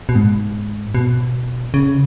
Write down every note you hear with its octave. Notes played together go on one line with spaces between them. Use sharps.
B2
G#2
B2
C#3